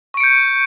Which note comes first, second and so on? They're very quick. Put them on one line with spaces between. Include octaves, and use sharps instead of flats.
C#6 D7 C#7 G6